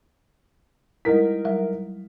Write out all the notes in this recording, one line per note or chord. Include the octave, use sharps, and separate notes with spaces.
G3 G#3 D#4 E4 A#4 B6
F#3 G3 E5